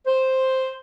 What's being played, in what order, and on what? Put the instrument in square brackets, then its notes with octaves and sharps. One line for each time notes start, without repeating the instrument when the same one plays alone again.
[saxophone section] C5